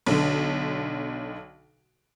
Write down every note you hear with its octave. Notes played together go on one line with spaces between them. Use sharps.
B1 D3